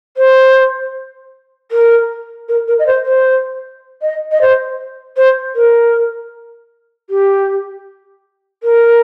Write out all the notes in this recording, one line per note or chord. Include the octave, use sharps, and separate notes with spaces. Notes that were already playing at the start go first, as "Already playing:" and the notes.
C5
A#4
A#4
A#4
D#5
C5
C5
D#5
D#5
C5
C5
A#4
G4
A#4